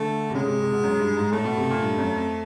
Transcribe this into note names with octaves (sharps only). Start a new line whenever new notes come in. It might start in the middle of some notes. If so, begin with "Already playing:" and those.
Already playing: D3 A3
C3
C#3 G#3
C3
C3
B2
F#2
G2
G#2
A2 A3
B2
C3
A#2
G2
F2
F#2
F2